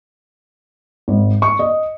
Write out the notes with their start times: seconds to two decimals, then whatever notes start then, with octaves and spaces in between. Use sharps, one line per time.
1.08 G#1
1.42 C#6
1.59 D#5